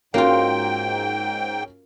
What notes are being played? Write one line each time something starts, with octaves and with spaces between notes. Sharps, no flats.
G#2 A#3 C#4 F4 F#4 A#4 G5